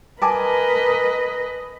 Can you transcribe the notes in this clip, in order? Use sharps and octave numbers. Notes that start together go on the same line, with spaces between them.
A#4 B4 D#5 G#5 A5 D6